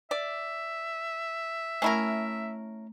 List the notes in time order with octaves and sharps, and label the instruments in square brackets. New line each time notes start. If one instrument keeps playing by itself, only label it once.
[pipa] D5 [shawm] E5
[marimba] A3 [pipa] C#4 E4 A#4